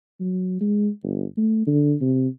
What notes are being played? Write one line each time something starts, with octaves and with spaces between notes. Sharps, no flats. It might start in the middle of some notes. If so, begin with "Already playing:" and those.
F#3
G#3
G1
A3
D3
C3